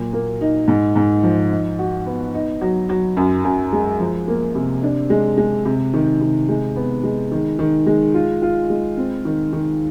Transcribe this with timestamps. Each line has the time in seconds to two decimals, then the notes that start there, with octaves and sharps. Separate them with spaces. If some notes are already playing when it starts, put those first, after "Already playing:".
Already playing: A#2 F#3
0.13 A#3
0.41 D#4
0.68 G#2
0.96 G#2
1.23 F3
1.51 D#4
1.79 F#4
2.06 B3
2.34 D#4
2.61 F#3
2.89 F#3
3.17 F#2
3.44 F#2
3.73 G#3
4.00 F3
4.28 A#3
4.55 C3
4.83 D4
5.10 G#3
5.37 G#3
5.65 C3
5.94 D#3
6.21 C3
6.49 G#3
6.76 B3
7.04 G#3
7.32 D#3
7.59 D#3
7.86 G#3
8.14 F4
8.42 F4
8.70 G#3
8.97 C4
9.25 D#3
9.53 D#3